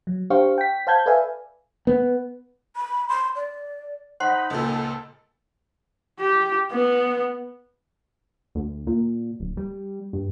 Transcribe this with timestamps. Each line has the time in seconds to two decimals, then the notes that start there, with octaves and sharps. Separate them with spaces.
0.07 F#3
0.30 D4 G4 C5 F5 C#6
0.58 G5 B6
0.87 C5 F5 A5 G6 G#6
1.06 A4 B4 D5 E5 F5 G#5
1.87 B3
2.76 B5
3.09 C6
3.36 D5
4.20 D#4 C5 F#5 B5 C6
4.50 C#2 A#2 A4
6.20 G4
6.72 B3
8.55 D2
8.87 A#2
9.40 D1
9.57 G3
10.13 G2